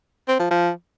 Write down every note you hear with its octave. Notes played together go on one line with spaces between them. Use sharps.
C4
F3
F3